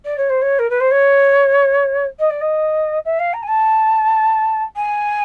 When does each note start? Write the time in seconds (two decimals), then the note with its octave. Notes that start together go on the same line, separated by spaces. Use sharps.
0.05 D5
0.17 C#5
0.29 C5
0.42 C#5
0.59 A#4
0.70 B4
0.80 C5
0.91 C#5
2.19 D#5
2.30 D5
2.41 D#5
3.05 E5
3.19 F5
3.33 A#5
3.42 G#5
3.47 A5
4.76 G#5